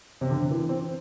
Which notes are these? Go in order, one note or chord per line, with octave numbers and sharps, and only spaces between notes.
C3
D3
E3
C4